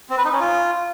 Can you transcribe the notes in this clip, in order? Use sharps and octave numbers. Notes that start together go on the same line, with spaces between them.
C4
B4
D#4
C#4
F4